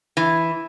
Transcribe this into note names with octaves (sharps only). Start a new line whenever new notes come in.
E3